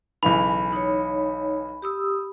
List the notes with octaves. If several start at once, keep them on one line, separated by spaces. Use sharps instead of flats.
B1 C#3 E3 B5
D#4 C#5
G4 D#6 E6